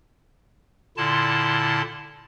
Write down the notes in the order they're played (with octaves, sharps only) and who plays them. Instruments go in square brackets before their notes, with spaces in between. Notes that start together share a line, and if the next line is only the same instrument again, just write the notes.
[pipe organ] A#2 D3 E4 A5 C6